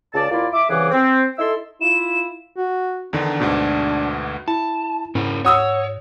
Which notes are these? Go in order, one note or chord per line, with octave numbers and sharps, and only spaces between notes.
C#2 D5 A5
D#2 A#3 E4 F4 D5
E5 D6
C2 C#3 E3 G#4 F#5 D6
C4
D#4 E4 A4 C6 E6
E4 F4 E7
F#4
E2 D3 D#3 D4
D2 G#2 B2
E4 A5
G#2 C#4 E4 A#4
F#4 C#5 D#6 E6